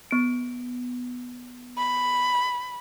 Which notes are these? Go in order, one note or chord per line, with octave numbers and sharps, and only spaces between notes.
B3 D7
B5